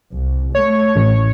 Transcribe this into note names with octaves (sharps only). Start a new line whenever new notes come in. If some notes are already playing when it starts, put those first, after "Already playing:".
C2
A3 C#5
A1